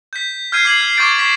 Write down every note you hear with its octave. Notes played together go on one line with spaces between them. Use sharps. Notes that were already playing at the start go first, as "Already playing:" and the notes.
G6 B6
F6 G6 G#6 C7 D#7
D6 G#6 C7 F#7
F6
C#6 D6 F6 G6 A6 D7
C#6 B6 E7